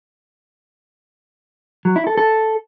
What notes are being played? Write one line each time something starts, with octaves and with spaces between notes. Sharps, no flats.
F#3
E4
A4
A4